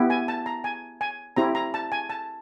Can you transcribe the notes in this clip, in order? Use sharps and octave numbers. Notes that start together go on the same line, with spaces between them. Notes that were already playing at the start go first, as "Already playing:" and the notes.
Already playing: B3 E4 G4
G#5
A5
A#5
G#5
G#5
C4 E4 G4 A#5
A#5
A5
G#5
A5